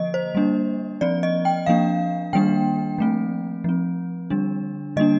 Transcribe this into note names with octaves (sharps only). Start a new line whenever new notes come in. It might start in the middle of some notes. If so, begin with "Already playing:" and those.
Already playing: D3 F3 A#3 D#5
C5
G3 A#3 D4
F3 C4 D5
D#5
G5
F3 A#3 D4 F5
D#3 G3 A#3 D4 G5
F3 A3 C4
F3 C4
D3 G3 D4
D3 G3 A#3 D4 D#5